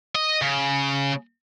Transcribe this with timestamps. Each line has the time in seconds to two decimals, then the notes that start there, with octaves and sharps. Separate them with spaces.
0.15 D#5
0.41 C#3